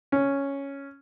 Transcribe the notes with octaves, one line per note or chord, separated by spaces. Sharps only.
C#4